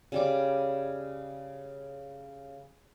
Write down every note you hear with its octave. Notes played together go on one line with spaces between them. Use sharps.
C#3 G3 D6